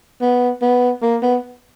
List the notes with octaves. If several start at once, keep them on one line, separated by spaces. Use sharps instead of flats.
B3
B3
A#3
B3